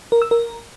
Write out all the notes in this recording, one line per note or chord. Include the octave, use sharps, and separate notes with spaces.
A#4
E6
A#4